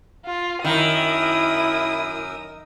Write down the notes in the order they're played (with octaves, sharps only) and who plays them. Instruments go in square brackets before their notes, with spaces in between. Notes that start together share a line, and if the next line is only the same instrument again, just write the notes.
[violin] F4
[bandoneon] F#2 A#4 E6 [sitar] D#3 [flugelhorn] E4 [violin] D#6